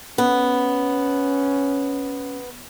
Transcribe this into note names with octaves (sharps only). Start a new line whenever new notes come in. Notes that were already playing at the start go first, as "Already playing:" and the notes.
B3 C#4